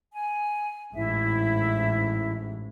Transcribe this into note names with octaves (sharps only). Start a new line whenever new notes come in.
G#5
A1 G#2 E4 E5